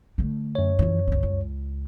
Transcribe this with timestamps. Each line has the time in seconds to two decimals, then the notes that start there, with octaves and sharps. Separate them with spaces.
0.18 D3 A3
0.55 F#2 C#5
0.79 F2 E3
1.07 C2 C#3
1.23 C#2